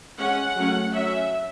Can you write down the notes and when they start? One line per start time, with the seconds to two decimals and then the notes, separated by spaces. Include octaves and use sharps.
0.19 G#3 C#4 F#5
0.56 F#3 A3 C#4
0.94 F#3 C#4 E5